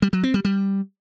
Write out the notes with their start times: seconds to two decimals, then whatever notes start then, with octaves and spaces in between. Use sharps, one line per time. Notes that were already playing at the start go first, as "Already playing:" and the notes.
0.02 G3
0.13 F#3
0.23 C4
0.34 G3
0.45 G3